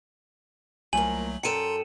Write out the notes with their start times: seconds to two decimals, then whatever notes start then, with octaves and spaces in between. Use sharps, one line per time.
0.93 C2 F3 F#3 A3 A#3 G#5 F#7
1.43 F#2 A4 G5 A#5 C6 C#7 D#7 E7